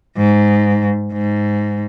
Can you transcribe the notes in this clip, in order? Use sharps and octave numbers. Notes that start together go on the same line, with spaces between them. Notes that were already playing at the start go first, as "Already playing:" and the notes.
G#2
G#2